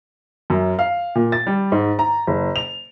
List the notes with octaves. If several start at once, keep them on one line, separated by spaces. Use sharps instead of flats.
F#2
F5
A#2
A6
G3
G#2
A#5
F#1
F7